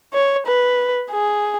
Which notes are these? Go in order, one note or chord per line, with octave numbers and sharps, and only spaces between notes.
C#5
B4
G#4